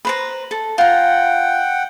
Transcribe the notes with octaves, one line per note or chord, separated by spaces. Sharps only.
B4 C5 A#5
A4
F4 F#5 G5 A#5